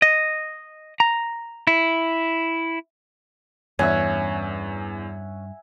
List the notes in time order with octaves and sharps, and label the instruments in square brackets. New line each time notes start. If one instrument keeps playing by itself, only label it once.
[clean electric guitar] D#5
A#5
E4
[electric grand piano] E2 [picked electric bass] G2 [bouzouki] C#4 [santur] E5 F#5 G#5